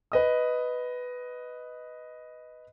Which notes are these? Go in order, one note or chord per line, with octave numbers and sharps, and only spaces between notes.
B4 D#5 D#6